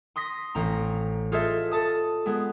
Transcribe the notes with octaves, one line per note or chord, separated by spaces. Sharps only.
C6 D#6 A#6 B6
A1 C4 A#5
F4 G#4 A4 C5 D#5 E5
A4 A5 D#6
G#3 B3 G#4